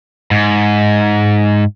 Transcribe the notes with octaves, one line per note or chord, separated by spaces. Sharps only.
G#2